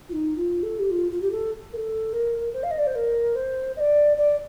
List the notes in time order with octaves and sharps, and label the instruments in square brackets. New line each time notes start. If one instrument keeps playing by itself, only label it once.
[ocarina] F4
D#4
F4
A4
G4
F4
F4
G4
A4
A#4
A4
A#4
C5
F5
D#5
D5
C5
A#4
C5
D#5
D5
D5